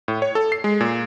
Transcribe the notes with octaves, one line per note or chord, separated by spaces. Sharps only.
A2
C#5
A4
C7
G#3
A#2